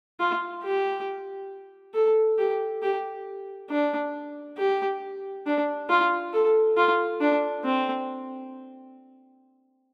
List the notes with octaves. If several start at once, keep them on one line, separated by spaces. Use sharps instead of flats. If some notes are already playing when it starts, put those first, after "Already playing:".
F4
G4
A4
G4
G4
D4
G4
D4
F4
A4
F4
D4
C4